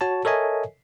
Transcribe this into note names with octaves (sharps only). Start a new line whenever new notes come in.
F#4 C#5 A5
A4 A#4 C#5 D#5 E5 G#5